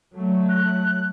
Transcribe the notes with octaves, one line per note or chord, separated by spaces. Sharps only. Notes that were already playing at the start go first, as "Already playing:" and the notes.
F#3 A3
F#6